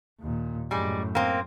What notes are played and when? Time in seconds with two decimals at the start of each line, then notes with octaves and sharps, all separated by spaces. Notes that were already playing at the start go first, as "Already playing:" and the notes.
0.20 D#2 A#2
0.71 F#2 A2 G3 G#3
1.15 A#3 C4